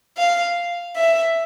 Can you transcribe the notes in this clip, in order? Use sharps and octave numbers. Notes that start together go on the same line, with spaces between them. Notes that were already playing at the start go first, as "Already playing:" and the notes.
F5
E5